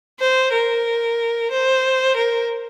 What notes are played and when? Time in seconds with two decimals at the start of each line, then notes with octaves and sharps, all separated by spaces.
0.20 C5
0.53 A#4
1.51 C5
2.16 A#4